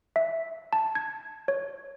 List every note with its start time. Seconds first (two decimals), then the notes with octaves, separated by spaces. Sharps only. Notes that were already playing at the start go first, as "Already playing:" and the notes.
0.16 E5
0.73 A5
0.95 G#6
1.48 C#5